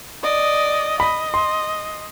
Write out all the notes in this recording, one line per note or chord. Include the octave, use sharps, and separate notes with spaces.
D5 D#5
D#5 B5
C6